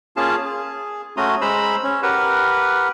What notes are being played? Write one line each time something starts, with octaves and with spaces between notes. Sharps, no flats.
A#3 C#4 F4 G#4 F5 A5
G#4
A3 C#4 F#4 A#5 C6 D#6
G#3 C5 A#5 B5 E6
C#4
G4 A#4 B4 F#5